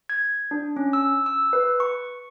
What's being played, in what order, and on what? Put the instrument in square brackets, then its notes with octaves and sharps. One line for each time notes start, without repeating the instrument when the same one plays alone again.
[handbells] G#6
D4
C#4
E6
E6
B4
C#6